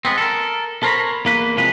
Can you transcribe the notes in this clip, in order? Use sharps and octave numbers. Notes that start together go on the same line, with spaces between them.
G#3 B3 C4
A4 A#4
A4 A#4 C5 C#5 A#5 B5
E2 A#3 B4
C3 F3 G#3 B4